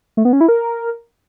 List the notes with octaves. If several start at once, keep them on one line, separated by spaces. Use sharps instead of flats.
A3
B3
C#4
E4
A#4